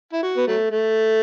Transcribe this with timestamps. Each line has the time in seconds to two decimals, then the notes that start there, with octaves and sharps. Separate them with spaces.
0.13 E4
0.23 F#4
0.37 B3
0.47 F#3 A3
0.71 A3